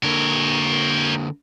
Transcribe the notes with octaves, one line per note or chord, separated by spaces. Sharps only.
D3 A#3 A#4 C#5